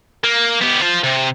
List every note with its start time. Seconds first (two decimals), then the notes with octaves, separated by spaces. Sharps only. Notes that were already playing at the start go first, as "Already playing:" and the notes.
0.24 A#3
0.62 B3 G4
0.82 F4 C5
1.04 C3